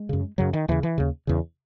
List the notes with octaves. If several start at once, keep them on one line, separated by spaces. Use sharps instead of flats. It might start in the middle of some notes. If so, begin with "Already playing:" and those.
Already playing: G#3
F#2 C#3
F#2 C#3 F#3
D#3
D#2 C#3 E3
E3
D#2 C#3
E2 C#3